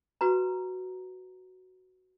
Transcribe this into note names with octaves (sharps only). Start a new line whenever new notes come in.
F#4 B4 A#5